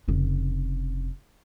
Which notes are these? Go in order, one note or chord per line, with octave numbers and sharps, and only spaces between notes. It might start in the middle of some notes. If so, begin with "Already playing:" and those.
F1 C#3